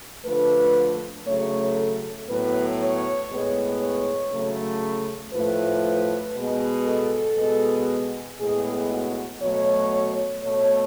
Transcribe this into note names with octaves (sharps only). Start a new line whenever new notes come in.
D3 F3 A3 B4
C#3 F#3 A3 C#5
A4
A2 F#3 B3 B4
C#5
A2 G#3 B3
C#5
C#3 F#3 A3
A2 F3 A3 B4
B2 G#3 B3
A4
B2 G#3 B3
A2 G#3 B3 G#4
F#4
B2 F#3 A3 C#5
B2 A3 C#5